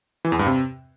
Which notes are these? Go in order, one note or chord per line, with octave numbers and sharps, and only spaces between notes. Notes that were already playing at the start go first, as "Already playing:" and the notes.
E3
E2
G2
C3